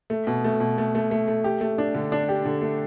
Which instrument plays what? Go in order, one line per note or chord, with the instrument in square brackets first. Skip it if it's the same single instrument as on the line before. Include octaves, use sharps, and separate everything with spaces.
[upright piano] A3
B2
A3
B2
A3
A3
A3
A3
G4
A3
D4
D3
D4
G4
D3
A3